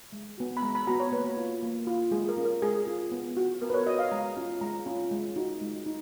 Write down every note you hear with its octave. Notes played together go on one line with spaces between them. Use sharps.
G#3
B3 F#4
B5
G#3 A#5
B5
B3 F#4 A#5
C#5
A#3 B4
F4
A#3
F4
G#3 G#4
A#4
C#4 F4
A#4
G#3 G#4
C#4 F4
B3
F#4
B3 A#4
B4
C#5
F#4 D#5
F5
G#3 A#5
C#4 F4
G#3 A#5
C#4 F4
G#3
D#4 F#4
G#3
D#4